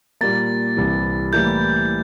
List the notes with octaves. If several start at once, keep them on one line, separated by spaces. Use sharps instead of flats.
A#2 G3 A#3 A6
C2 C3 E3
A2 E3 G3 A#3 E4 G6